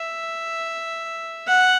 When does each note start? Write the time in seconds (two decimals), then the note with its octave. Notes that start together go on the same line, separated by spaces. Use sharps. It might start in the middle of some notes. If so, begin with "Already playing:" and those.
Already playing: E5
1.48 F#5